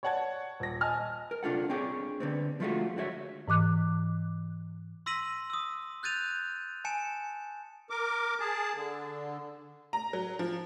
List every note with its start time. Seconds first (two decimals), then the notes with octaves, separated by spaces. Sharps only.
0.03 C#5 D5 F#5 A5 G#6
0.60 D#1 A#6
0.81 D#5 G#5 A5 F6
1.31 A#4
1.43 C3 D4 F4 A4 F#5
1.69 C4 D4 G4 G#4 C#5
2.20 D3 B3 C4
2.60 F3 G#3 A3 C#4 F4 F#4
2.97 D3 F#4 C#5 E5
3.48 G#2 E3 D6 F#6
5.06 C6 E6 A#6 B6 D#7 F#7
5.50 D#6 E6
6.03 F#6 G6 A6 D#7 F7
6.85 G#5 A5 C#7 E7
7.90 A#4 D6
8.40 G#4 A5
8.75 D3
9.93 A#5
10.13 F#3
10.39 F3